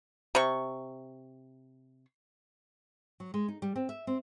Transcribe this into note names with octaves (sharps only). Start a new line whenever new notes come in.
C3 C#6
F#3
G#3
D#4
G3
C4
E5
C4